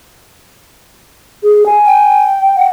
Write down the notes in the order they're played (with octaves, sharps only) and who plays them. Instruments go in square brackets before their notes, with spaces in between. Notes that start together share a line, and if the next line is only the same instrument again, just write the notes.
[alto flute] G#4
G#5
[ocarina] G5
[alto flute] F#5